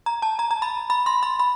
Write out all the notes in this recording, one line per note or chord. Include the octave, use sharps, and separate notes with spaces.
A#5
A5
A#5
A#5
B5
B5
C6
B5
B5